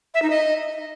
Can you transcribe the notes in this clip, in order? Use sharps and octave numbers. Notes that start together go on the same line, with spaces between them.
E5
D#4
D#5